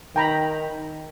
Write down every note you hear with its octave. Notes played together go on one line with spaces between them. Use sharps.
D#3 G5 A#5 B5